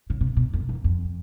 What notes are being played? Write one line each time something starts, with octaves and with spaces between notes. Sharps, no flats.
C#3
C3
B2
F2
E2
F2